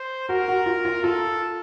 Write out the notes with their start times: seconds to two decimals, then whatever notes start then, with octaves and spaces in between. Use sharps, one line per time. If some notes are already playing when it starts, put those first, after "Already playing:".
Already playing: C5
0.29 F#4 A#4
0.48 F#4
0.66 F4
0.85 F4
1.03 F4 A4